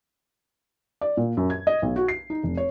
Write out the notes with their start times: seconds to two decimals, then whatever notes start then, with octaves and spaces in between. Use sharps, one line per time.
1.01 D5
1.17 A#2
1.37 F#2
1.50 G#6
1.67 D#5
1.82 B1
1.96 F#4
2.08 C7
2.30 D#4
2.43 F1
2.57 C#5